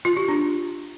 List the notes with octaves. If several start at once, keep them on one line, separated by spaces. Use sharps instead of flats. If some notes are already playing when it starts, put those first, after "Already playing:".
F4
G4
D4